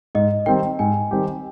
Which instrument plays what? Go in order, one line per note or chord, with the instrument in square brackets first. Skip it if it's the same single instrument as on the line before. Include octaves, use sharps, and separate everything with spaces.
[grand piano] G#2 [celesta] D#5
[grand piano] D#3 G3 C4 G4 [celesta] G5
[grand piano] G#2 [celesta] G#5
[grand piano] D#3 G3 C4 G4